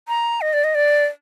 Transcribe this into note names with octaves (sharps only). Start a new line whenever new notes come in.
A#5
D#5
D5
D#5
D5